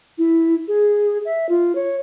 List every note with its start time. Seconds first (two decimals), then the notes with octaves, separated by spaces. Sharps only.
0.18 E4
0.68 G#4
1.25 E5
1.49 F4
1.75 C#5